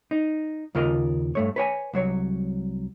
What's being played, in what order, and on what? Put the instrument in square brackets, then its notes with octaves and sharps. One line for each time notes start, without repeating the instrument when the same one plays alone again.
[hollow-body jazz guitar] D#4
D#2 C#3 F4 A#4 D#5
G2 A3 C#5
B4 C#5 G#5
C2 F#3 C#5